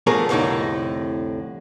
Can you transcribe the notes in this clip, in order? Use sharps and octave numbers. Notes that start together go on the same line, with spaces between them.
F3 A3 B3 D4 G#4 A#4
C2 F2 A2 D3 D#4